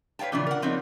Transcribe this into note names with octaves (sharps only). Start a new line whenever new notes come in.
B4 C#5 F5 G5 A5
A#2 C#3 E3 F3 D4
A#4 F#5
F3 B3 C4 D4 D#4 C#5